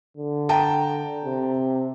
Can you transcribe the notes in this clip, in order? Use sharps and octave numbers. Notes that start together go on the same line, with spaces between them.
D3
G5 A5 A#5
C3